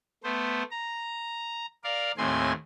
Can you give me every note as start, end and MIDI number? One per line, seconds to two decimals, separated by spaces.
0.24 0.63 57
0.24 0.63 59
0.24 0.63 72
0.71 1.66 82
1.84 2.12 70
1.84 2.12 74
1.84 2.12 77
2.17 2.52 39
2.17 2.52 45
2.17 2.52 60
2.17 2.52 80
2.17 2.52 84